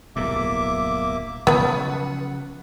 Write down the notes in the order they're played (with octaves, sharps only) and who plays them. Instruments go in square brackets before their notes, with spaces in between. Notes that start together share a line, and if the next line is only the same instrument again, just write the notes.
[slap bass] D1 B1 G2 [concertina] A#3 E5 D6
[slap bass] C#3 F3 F#3 [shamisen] B3 B4 [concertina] F#5